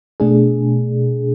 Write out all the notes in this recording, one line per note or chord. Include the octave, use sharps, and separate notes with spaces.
B2 A3 D4 G#4